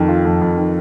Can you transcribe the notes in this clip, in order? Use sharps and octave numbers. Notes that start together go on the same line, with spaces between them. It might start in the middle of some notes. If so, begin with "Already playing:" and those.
Already playing: F2 D#3
F4
F2
F2
D#3